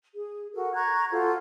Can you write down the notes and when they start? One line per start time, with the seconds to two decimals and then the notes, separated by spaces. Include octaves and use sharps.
0.13 G#4
0.53 F#4 A4 A#4
0.74 A#5 C#6 F#6 G#6
1.11 F4 F#4 A4 C5